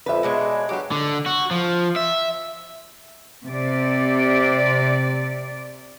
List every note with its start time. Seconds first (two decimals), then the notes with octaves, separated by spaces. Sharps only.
0.06 F2 B4 E5
0.23 B2 G#3 D4 C#5
0.69 G2 F#3 G3 G4
0.91 D3
1.26 F#4
1.51 F3
1.96 E5
3.47 C3 D5